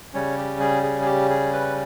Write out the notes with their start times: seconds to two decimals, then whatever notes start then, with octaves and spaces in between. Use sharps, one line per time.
0.14 C#3 G3 C#4 C#5
0.38 G4
0.60 G#4
0.83 G#4
1.02 G#4
1.06 G4
1.30 G#4
1.53 B4